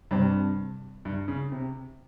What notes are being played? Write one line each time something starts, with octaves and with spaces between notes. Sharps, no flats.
G2 C3 G3 C4
G2
C#3
C3